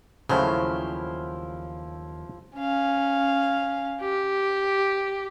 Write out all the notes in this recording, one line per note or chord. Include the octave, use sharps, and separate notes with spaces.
D#2 C#3 F3 F#3 A3 E4 G4 C5
C#4 F5
G4